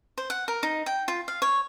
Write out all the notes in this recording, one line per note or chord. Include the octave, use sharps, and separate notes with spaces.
C5
F#5
A#4
D#4
G5
F4
F5
C#5